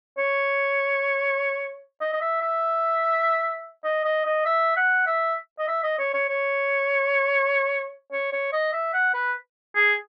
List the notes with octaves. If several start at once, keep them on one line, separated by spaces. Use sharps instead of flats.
C#5
D#5
D#5
E5
E5
D#5
D#5
D#5
E5
F#5
E5
D#5
E5
D#5
C#5
C#5
C#5
C#5
C#5
D#5
E5
F#5
B4
G#4